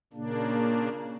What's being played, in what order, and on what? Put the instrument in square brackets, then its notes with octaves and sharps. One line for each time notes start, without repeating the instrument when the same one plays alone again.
[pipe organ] A#2 C#3 A#3 D4